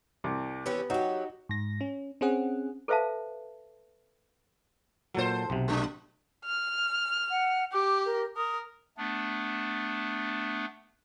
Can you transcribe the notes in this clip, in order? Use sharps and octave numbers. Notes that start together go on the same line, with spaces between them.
C2 C3
E3 B3 C#4 G4
F#3 D#4 F#4 G4
G#2 A#6
C#4
C4 C#4 G#4 F#5
A4 B4 C5 E5 F5 A5
A#2 F#3 A4 C5
B1 C3
G#3 D4
F6
F#5
G4 D6
A#4
A#4 D#6
A3 B3 D4